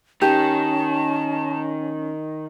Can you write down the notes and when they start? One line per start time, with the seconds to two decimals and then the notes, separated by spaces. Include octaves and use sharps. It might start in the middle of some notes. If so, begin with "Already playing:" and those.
0.22 D#3 C#4 G4 A5